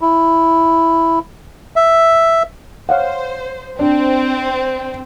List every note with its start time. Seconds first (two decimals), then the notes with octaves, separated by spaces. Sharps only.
0.01 E4
1.76 E5
2.89 C5 C#5 F5 F#5
3.79 C4 D4